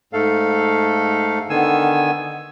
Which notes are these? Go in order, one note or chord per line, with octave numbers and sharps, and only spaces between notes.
G#2 A3 A4 F5
D3 D#3 B3 G#5 E6